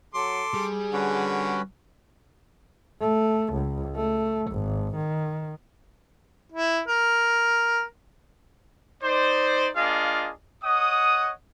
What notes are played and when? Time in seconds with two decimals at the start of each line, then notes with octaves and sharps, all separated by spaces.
0.15 F#3 A4 C6 D6
0.54 G3 G#4
0.93 D3 C#4 F#4 B4
3.01 A3
3.53 C#2
3.96 A3
4.52 G#1
4.96 D#3
6.52 E4
6.88 A#4
9.03 D#4 C5 D5
9.76 A#3 D4 F4 G#4 D#5 F5
10.63 C#5 D#5 F#5 D#6